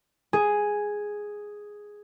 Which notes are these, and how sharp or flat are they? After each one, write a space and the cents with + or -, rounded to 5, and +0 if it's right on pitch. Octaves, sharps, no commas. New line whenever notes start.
G#4 +0